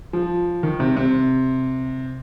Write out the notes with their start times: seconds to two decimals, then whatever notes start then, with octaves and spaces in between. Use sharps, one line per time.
0.13 F3
0.63 D#3
0.80 C3
0.97 C3